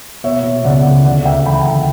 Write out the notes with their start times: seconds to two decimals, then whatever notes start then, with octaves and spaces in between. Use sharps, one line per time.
0.24 B2 C#5 E5
0.44 B2
0.64 C#2 D5 F#5
0.85 C#2
1.04 D2 D5 F#5
1.25 C#3 E5 G5
1.46 E3 G5 B5
1.60 A5
1.66 D2 G5 B5